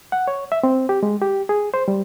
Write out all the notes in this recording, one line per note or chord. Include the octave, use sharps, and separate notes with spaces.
F#5
C#5
E5
C4
G4
G#3
G4
G#4
C5
G3